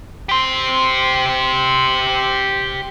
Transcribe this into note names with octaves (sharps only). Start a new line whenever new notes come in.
G4 C5